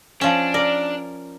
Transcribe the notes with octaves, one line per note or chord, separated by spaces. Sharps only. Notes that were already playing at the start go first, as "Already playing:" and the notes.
F3 C#4 D4
A#4 D5